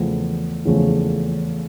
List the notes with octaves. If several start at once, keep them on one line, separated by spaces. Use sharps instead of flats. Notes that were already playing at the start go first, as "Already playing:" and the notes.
Already playing: E2 C#3 F3 A3
E2 C#3 F3 A3